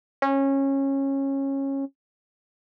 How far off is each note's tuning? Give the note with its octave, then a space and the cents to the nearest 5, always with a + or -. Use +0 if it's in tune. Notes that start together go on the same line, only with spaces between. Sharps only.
C#4 -20